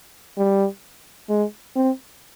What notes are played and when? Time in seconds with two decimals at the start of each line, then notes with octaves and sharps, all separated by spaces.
0.37 G3
1.29 G#3
1.76 C4